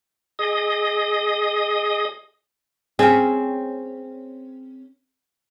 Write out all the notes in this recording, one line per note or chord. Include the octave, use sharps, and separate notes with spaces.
G#4 D#5 D#6
C4 C#4 G#4